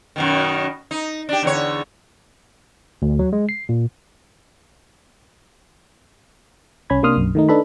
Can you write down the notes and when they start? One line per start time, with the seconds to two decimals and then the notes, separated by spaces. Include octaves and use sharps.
0.16 F#2 B2 D#3
0.91 D#4
1.29 D4 G4
1.43 E2 D3 C#5
3.02 D2
3.19 F#3
3.33 G#3
3.49 C7
3.69 A#2
6.90 C2 C#4 B5 G#6
7.03 C3 A#3 D4 C6 D#6 F6
7.16 B1 F#2
7.35 D#3 A3 D#4
7.49 D4 D#4 A4 B4 B5